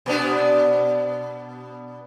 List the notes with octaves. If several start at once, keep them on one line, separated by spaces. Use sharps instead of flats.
B2 B3 D4